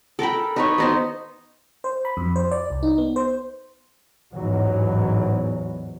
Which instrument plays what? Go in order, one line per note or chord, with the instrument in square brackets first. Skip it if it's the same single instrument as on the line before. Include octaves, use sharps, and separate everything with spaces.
[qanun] A4 A#4 G5 B5
D#4 B4 C#5
B3 D#4 C5
[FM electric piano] C5
B5
F2
C5
D5
C2
D#4
B3
C5
[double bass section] A1 E2 G#2 E3 F#3